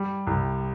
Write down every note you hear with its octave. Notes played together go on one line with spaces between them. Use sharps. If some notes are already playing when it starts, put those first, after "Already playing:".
Already playing: G3
C2